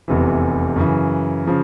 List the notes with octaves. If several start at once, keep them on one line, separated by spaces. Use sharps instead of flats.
F1 E2 C3 E3
F#2 C#3 E3
C#3 F3